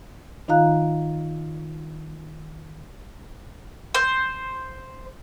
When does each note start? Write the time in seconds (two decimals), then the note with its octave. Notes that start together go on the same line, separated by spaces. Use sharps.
0.48 D#3 D#4 F4 F5 A#5 F#6
3.95 C5